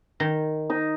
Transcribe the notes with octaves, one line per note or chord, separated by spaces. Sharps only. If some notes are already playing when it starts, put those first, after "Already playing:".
D#3
D#4